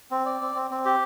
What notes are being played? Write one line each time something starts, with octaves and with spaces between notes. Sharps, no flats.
C4
D5
C4
C4
C4
G4